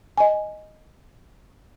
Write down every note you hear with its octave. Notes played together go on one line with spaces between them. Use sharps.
D#5 G#5